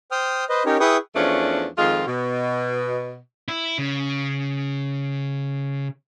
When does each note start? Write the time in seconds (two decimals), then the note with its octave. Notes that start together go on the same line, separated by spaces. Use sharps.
0.11 C5 G5 D#6 F6
0.49 B4 C5 D#5
0.66 C#4 D#4 G4 A#4 C#5
0.80 E4 G#4 B4 G5 C#6 D#6
1.15 E2 F3 A3 C#4 D4
1.77 F2 D#3 G#3 F4
2.07 B2
3.48 E4
3.78 C#3